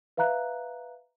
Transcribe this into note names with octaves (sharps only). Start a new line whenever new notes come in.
B4 E5 F5 A#5 F#6